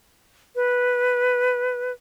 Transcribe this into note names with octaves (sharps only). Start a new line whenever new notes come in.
B4